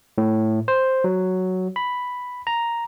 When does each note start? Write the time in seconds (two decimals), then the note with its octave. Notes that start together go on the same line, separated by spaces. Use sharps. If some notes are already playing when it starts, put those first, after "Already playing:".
0.18 A2
0.68 C5
1.04 F#3
1.76 B5
2.47 A#5